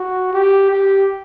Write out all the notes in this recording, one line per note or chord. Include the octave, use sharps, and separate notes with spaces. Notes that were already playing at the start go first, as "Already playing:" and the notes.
Already playing: F#4
G4
G4